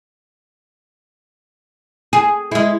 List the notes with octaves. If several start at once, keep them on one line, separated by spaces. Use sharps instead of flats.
G#4
G#3 E4